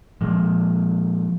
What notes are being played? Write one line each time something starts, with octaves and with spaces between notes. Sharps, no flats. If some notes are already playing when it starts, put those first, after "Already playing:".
A#2 F3 G#3